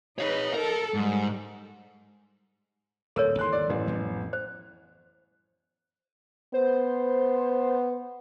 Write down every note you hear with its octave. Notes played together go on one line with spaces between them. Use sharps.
D#4 B4 C#5 F5
A4 A#4
G#2 G3
D1 G#2 A4 A#4 C#5
G1 D#2 E3 C6 F#6
D5
A1 F#2
F2 G3 B3
C5
B3 C5